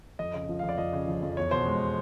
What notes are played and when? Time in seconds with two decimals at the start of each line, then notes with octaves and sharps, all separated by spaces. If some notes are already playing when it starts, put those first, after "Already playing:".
0.19 F2 D#5
0.34 C#3 D#5
0.49 F3
0.59 F2 F5
0.69 D5
0.78 F2 D#5
0.93 C#3
1.08 F3
1.23 F2
1.37 E2 C#5
1.51 B2 C5
1.66 G#3